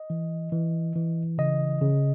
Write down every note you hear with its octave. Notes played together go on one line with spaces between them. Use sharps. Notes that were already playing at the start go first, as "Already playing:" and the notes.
Already playing: D#5
E3
E3
E3
C#3 D#5
C#3